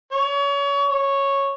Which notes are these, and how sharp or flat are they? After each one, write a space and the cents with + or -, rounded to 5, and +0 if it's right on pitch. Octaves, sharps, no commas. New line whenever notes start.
C#5 +30
C#5 -5